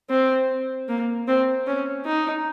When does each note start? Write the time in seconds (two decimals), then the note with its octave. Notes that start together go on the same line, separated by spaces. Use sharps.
0.10 C4
0.89 A#3
1.28 C4
1.67 C#4
2.06 D#4